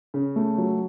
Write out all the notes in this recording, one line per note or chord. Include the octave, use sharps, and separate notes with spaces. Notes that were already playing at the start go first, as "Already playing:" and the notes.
C#3
A3
F#3